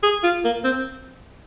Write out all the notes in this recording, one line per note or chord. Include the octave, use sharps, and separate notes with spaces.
G#4
F4
A#3
C4